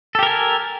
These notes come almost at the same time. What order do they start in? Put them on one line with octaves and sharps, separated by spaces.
A4 G4 A#4 G#5